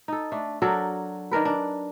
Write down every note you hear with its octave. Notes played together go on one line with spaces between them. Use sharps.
D#4 A4
A3 D4
F#3 D4 A4 A#4
D#3 D4 A#4 B4
D4